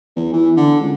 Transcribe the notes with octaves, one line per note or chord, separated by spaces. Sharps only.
E2
E3
D3
C#2